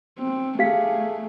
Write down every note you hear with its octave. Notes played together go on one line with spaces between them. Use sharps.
C4
A3 G4 G#4 F5 B6